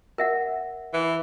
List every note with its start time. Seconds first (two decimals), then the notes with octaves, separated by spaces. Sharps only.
0.18 A#4 E5 F#5
0.93 E3